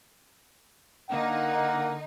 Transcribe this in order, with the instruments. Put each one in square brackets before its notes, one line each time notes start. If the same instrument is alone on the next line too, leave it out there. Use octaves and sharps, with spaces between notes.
[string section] D3 D#4 [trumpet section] A#3 [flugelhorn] F#5